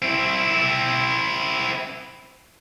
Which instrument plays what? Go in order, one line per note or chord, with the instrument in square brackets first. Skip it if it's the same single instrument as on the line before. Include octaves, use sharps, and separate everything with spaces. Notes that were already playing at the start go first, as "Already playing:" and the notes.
[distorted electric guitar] C4 E4